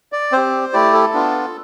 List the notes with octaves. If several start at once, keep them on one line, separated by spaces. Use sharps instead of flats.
D5
C4 G4 C5
A3 E4 G4 D5
A4
B3 D4 F4